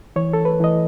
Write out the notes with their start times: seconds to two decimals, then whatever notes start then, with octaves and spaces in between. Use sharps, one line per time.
0.16 E3 C#5
0.33 A4
0.45 B4
0.60 E3 D#5